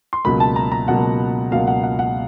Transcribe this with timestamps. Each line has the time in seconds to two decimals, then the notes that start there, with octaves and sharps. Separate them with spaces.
0.13 C6
0.25 C#2 B2 F#3 A#3 B5
0.40 A5
0.56 A#5
0.72 A#5
0.88 C#2 B2 F#3 A#3 F#5
1.52 C#2 B2 F#3 A#3 F5
1.67 F#5
1.83 F#5
1.99 F#5